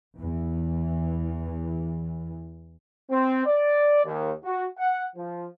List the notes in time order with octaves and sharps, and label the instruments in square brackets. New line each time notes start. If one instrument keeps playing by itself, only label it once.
[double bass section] E2 E3
[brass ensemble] C4
D5
D#2
F#4
F#5
F3